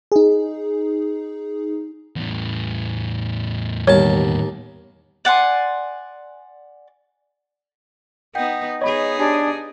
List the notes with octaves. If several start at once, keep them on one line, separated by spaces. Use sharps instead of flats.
D#4 G#4
E2 A2
D#2 B2 G3 C#5 A5
D5 F#5 G#5 C6
B3 D#4 F#5 G5 G6
B3 D#4 G#4 C#5 D#5 B5
D4 G4 G#5 G#6